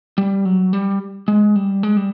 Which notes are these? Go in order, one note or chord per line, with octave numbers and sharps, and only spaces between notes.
G3
F#3
G3
G#3
G3
G#3
G3